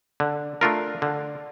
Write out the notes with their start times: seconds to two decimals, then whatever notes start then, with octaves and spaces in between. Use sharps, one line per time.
0.20 D3
0.61 A3 D4 F4 A#4
1.02 D3